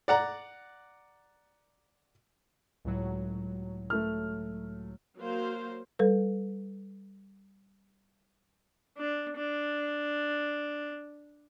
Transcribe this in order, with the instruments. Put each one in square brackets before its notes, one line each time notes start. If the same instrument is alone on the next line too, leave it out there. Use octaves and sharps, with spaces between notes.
[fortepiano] D5 F#5 A#5
[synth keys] C#2 A2 F#3
[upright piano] A3 F6
[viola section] F#3 A#3 C5 F5
[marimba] G3 A4 B4
[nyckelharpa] D4
D4